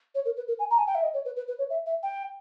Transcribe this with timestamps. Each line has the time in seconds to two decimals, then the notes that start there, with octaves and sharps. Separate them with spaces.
0.15 C#5
0.25 A#4
0.37 B4
0.48 A#4
0.59 G#5
0.70 A#5
0.78 G#5
0.87 G5
0.95 E5
1.03 D#5
1.14 C#5
1.25 B4
1.36 B4
1.48 B4
1.59 C#5
1.70 E5
1.86 E5
2.03 G5